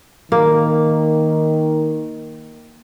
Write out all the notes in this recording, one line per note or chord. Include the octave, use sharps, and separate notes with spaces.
D#3 A#3